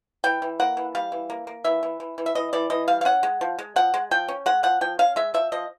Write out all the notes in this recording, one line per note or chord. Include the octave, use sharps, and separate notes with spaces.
E3 G5
E3
A#3 F#5
E3
G3 F5
E3
A#3
A#3
E3 E5
E3
E3
E3
E5
E3 D#5
E3 D5
E3 D#5
G3 F5
F5
C#4 F#5
G#3
F3
G#3
F3 F#5
G#3
F3 G5
C#4
G#3 F#5
F3 F#5
F3 G5
C#4 F5
G#3 E5
F3 E5
F3 D#5